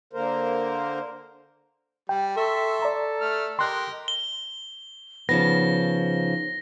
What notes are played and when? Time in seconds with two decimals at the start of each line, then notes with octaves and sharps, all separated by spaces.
0.13 D3 A#3 A#4 C5
2.09 G3 G5
2.37 A4 E5 C6 C#6
2.82 D5 A#5
3.21 A3 F6
3.59 G4 A#4 D#5 C6 F#6
4.08 G7
5.29 C#3 F3 B3 D#4 A#6